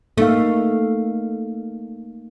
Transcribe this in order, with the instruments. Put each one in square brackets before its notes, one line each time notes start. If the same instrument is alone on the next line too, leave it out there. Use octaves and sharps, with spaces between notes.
[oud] A3 [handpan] A#3 D#4 F5